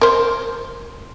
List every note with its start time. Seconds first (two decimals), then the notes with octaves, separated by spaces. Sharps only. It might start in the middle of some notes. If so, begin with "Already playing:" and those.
0.01 A#4 C5